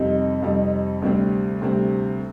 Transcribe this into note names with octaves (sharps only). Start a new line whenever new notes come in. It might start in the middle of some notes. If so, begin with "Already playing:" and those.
Already playing: F2 C3 G3 C4 D#4
F2 C3 G3 C4 D#4
D2 C3 G3 C4
D2 C3 G3 C4